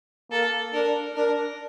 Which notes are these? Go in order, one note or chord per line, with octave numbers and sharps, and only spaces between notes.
A#3 A4
D4 A#4
D4 A#4